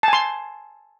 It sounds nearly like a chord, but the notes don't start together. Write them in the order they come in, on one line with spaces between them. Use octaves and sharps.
A5 G#5 C6